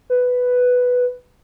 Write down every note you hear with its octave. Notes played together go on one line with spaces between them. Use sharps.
B4